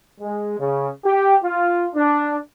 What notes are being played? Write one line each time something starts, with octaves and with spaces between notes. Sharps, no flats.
G#3
C#3
G4
F4
D4